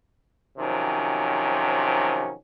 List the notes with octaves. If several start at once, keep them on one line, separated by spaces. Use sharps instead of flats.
C3 D#3 F3 F#3 C#4